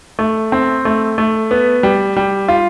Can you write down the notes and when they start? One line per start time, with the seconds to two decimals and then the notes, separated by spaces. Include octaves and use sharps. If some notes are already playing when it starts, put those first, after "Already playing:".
0.19 A3
0.52 C4
0.85 A3
1.18 A3
1.51 B3
1.83 G3
2.17 G3
2.48 F4